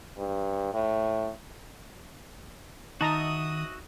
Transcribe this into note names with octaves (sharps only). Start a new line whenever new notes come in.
G2
A2
D#3 D#4 F#4 D#5 E5 A5 A#5 D#6